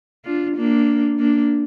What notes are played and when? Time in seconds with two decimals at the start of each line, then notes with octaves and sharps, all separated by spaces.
0.25 D4 F4
0.57 A#3 D4
1.19 A#3 D4